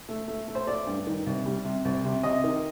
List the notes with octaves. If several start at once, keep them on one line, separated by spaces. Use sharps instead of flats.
A3
A3
A3
C5
A3 D5
G2
D#3
C2
G3
C3
C2
C3
C3 D#5
D#3